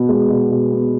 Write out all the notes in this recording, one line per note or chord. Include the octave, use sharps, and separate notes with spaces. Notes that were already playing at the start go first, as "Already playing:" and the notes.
Already playing: B2 B3
G#3
B2
B2
B3